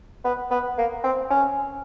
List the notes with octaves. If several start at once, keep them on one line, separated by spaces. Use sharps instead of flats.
B3
B3
A#3
C4
C#4